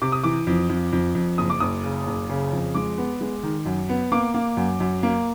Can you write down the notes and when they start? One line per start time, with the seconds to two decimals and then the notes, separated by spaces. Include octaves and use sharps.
0.02 C3 D6
0.12 D#6
0.24 E3 D6
0.47 F2
0.70 F2
0.93 F2
1.15 F2
1.38 F#1 D#6
1.50 D6
1.60 F#1 D#6
1.84 C#3
2.07 F#1
2.29 C#3
2.52 F2
2.75 G#3 D6
2.98 B3
3.21 G#3
3.43 D#3
3.66 F#2
3.89 B3
4.12 A#3 D6
4.34 A#3
4.57 F#2
4.80 F#2
5.03 A#3